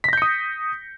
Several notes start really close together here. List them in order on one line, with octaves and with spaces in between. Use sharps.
B6 A#6 G6 C#7 D#6